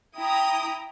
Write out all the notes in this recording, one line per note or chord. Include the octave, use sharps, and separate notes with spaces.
E4 G5 A#5 D#6